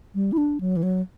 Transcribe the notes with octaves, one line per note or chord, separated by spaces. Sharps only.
G3
E4
D4
F#3
E3
F#3